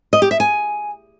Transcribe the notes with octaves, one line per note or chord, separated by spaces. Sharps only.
D#5
G4
E5
G#5